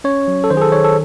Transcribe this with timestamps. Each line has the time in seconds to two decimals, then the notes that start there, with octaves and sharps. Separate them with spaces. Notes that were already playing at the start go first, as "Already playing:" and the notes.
0.04 C#4 C#5
0.28 F#3
0.44 A4
0.50 D#3 C5
0.57 G#4
0.61 A4
0.72 D#3 C#5
0.85 A4